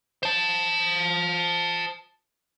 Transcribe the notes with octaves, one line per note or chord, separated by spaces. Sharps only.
C5 A5